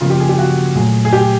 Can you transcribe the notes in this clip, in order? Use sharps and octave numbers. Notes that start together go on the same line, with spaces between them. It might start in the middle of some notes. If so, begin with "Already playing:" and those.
C#3 F3 A#3 F4
G4
G#4
G4
F#4
A#2 F#3 A3 G#4
G#4
G4